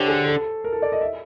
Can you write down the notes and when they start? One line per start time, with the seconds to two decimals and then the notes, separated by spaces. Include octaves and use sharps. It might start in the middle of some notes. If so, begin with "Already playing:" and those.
Already playing: D3 G4 C5 C#5
0.08 G#4
0.26 A4
0.64 A#4
0.73 A4
0.82 D5
0.92 D#5
1.01 E5